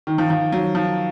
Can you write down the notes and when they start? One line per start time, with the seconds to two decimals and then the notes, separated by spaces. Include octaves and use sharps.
0.07 D#3
0.18 F3
0.30 F3
0.52 F#3
0.75 F3